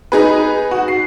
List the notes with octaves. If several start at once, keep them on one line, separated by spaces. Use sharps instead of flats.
D#4 G#4 B4
F#4
C7